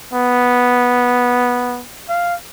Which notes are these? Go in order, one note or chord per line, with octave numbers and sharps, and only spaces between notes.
B3
F5